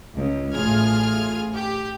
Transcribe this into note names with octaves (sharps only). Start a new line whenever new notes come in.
C#2
A1 A2 F4 G#4 F6 G#6
G4